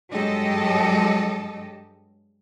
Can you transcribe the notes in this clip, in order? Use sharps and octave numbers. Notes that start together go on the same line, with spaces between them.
G2 F#3 G#3 G4 A4 D#5